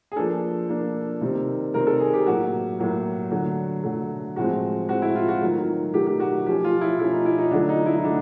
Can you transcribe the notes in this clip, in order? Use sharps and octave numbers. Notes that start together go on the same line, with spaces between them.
G#4
F3 A#3 D4 A4
F3 A#3 D4
C3 D#3 G3 C4
C3 D#3 G3 C4 A#4
A4
G#4
G4
A2 F#3 A#3 F#4
A2 F#3 A#3
D3 F#3 A3
D3 F#3 A3
A2 F3 G#3 C4 F#4
A2 F3 G#3 C4 F#4
E4
F4
F#4
D#3 F#3 A3
D#3 F#3 A3 G4
G4
F#4
F3 A3 C#4 G4
F4
E4
F3 A3 C#4 E4
D#4
E4
D#4
D3 F#3 A3 D4
D#4
E4
D#4
D3 F#3 A3 D4